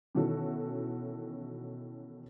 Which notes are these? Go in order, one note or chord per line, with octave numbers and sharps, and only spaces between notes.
B2 D#3 E3 C#4 F#4 A4